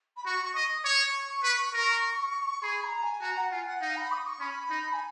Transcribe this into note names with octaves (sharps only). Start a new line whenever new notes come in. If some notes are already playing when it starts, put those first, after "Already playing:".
B5
F#4 C#6
C#6
D#5 D#6
C#5 C#6
B4
A#4
G#4 B5
B5
A#5
G#5
F#4 A#5
F#5
F4 G#5
F#5
D#4 F5
B5
D#6
C#6
C#4 B5
D#4
G#5